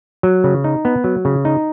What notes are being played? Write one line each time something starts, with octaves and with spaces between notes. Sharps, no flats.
F#3
C#3
D#4
B3
F#3
C#3
D#4